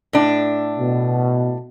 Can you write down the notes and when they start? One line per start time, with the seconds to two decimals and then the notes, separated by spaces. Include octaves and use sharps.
0.13 A2 D4
0.79 B2